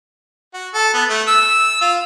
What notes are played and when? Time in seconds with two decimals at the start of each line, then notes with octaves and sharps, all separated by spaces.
0.54 F#4
0.74 A4
0.94 B3
1.09 A3
1.27 E6
1.81 F4